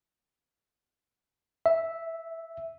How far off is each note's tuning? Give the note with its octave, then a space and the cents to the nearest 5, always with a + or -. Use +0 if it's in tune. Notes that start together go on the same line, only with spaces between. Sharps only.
E5 -5